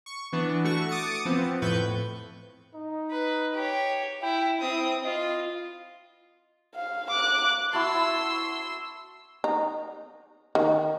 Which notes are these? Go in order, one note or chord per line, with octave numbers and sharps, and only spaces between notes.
C#6
E3 B3 D4
A3 F#4 C#6
D6 D#6 A6 C#7
F3 B3 C4
F2 A2 B4 C#6 G6
D#4
B4
G4 C#5
E4 G5
C4 E4 D#6
F4 D#5
F5
D6 F#6
E4 F#4 A5 C6 E6
D#4
D#3